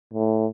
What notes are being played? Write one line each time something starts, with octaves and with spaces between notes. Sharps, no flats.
A2